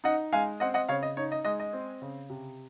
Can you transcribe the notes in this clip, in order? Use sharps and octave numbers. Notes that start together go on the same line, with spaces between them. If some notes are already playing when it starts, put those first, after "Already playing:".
D#4 D#5 F#5
G#3 F5 G#5
C4 D#5 F#5
D#5 F#5
C#3 C#5 F5
D#5
D#4 C#5
D#5
G#3 D#5
D#5
C4
C#3
C3